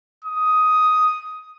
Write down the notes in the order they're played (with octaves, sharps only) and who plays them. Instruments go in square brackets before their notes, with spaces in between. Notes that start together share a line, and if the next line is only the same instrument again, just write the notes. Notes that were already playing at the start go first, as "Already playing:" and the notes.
[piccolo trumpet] D#6